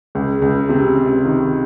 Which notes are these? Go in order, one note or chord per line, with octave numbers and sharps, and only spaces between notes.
C#2
C#2
C3
C3
D#3